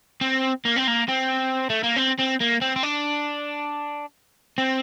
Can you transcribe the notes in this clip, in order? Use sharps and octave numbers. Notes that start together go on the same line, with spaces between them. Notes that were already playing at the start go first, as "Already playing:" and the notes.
C4
A#3
C4
A#3
C4
A3
A#3
C4
C4
A#3
C4
C4
D4
C4